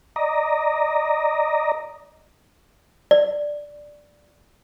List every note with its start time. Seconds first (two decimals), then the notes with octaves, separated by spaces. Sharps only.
0.16 D5 D#5 A#5
3.11 D5